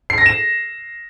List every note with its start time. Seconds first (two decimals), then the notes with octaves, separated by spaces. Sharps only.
0.10 C7
0.18 A#6
0.26 E7